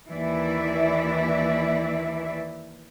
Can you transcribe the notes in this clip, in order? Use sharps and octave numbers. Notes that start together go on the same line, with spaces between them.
D#2 E3 E4 D5 E5